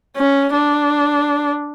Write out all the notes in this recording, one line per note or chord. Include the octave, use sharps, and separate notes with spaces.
C#4
D4